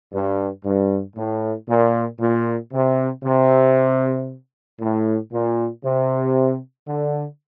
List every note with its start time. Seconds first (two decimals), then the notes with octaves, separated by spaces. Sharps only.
0.12 G2
0.64 G2
1.17 A2
1.68 A#2
2.20 A#2
2.73 C3
3.24 C3
4.80 A2
5.32 A#2
5.84 C3
6.88 D3